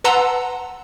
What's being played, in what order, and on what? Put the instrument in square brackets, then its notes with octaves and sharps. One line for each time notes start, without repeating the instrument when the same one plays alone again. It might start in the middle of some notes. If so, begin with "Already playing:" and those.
[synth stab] B4 F#5 A5 A#5 C6 E6